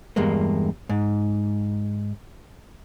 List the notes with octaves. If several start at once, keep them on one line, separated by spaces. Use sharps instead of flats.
E2 G2 G#3 A#3
G#2